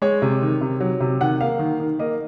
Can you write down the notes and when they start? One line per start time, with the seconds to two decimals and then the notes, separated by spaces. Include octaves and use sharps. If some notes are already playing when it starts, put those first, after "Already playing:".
0.02 G#3 C#5
0.22 C3
0.42 D#3
0.61 C3
0.80 F#3
1.00 C3
1.21 D#3 F#5
1.41 A#3 F5
1.59 D#3
1.80 D#3
1.99 A#3 D#5